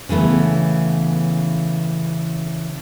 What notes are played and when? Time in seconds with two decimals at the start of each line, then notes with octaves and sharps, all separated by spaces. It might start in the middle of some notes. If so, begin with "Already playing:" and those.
0.09 C#3 E3 A3 B3